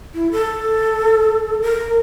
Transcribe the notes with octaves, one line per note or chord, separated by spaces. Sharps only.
E4
A4
A#4